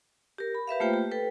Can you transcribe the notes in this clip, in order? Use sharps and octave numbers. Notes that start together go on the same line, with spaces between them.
G4 A#4
B5
G4 B4 E5 F5
A3 A#3 F4 G4 C5 G5
G4
A4 B4 G5